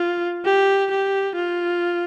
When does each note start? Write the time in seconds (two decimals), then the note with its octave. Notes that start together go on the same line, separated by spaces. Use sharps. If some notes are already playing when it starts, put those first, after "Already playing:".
Already playing: F4
0.45 G4
0.91 G4
1.36 F4